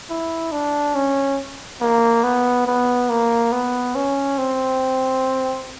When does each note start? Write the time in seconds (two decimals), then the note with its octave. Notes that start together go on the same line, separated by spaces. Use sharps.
0.09 E4
0.52 D4
0.95 C#4
1.81 A#3
2.23 B3
2.66 B3
3.09 A#3
3.52 B3
3.95 C#4
4.38 C4